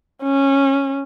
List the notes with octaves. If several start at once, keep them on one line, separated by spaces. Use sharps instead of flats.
C#4